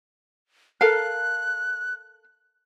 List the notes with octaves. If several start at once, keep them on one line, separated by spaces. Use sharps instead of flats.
A4 A#4 F5 F#6